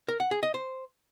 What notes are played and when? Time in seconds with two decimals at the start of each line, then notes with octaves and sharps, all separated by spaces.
0.08 A#4
0.20 F#5
0.31 G#4
0.43 D#5
0.54 C5